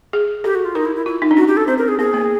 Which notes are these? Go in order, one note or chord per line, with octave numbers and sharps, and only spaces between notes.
G#4
G4 A4
F#4
F4
D#4 A#4
E4
E4
E4 F4
D#4
D4
C#4 F#4
G4
A4
C4 C5
A#4
G#4
B3 G#4
A#3